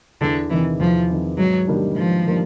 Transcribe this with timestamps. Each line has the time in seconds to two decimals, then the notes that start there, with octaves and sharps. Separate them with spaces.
0.21 E2 D3
0.50 C3 D#3 E3
0.80 E2 F3
1.09 C3 D#3
1.38 G#2 F#3
1.68 D#3 G3 A#3 D4
1.96 G#2 F3
2.26 D#3 G3 A#3 D4